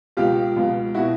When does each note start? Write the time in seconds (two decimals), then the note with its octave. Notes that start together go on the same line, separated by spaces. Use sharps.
0.17 C#2 B2 F4 G4
0.56 C#2 B2
0.94 B2 E4 F#4